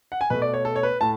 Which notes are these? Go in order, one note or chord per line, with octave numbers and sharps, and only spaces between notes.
F#5
G#5
B2 A3 B4
D5
C#5
A4
C#5
B4
A2 A5